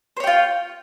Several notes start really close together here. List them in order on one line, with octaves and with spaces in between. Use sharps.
C5 C#5 G5 F4